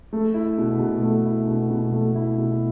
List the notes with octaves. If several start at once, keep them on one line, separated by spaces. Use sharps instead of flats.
A3
E4
B2
B2
A3
E4
B2
B2
A3
E4
B2